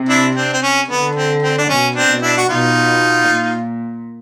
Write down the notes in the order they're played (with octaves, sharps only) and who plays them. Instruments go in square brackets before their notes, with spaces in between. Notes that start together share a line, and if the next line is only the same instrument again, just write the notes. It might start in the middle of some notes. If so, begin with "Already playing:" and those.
Already playing: [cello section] C3
[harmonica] D4 E4
C4 D4
C4
C#4
[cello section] D3 [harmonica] B3
[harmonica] C4
C4
D4
[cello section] B2 [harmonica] C#4
[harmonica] C4 D4
[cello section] B2
[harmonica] D4 E4
F#4
[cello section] B2 [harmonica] D#4 F4
[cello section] A#2